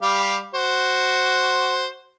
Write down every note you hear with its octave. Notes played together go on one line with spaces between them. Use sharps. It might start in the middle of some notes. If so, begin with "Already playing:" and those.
G3 G4 F5
F#4 C5